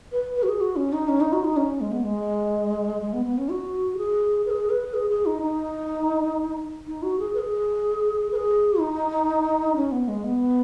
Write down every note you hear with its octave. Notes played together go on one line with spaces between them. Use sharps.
B4
B4
F#4
G#4
F#4
C#4
D#4
C#4
D#4
F#4
D#4
C#4
G#3
B3
G#3
G#3
B3
B3
C#4
F#4
G#4
B4
G#4
B4
G#4
G#4
D#4
D#4
D#4
F#4
G#4
B4
G#4
B4
G#4
D#4
C#4
B3
G#3
B3